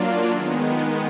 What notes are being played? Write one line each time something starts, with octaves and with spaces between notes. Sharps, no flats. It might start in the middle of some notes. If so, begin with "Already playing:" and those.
Already playing: F#3 A#3 D4 F4
D#3 G#3 B3